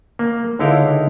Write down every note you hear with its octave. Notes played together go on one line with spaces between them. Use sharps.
A#3
C#2 D3 D#4 E4 F5 G5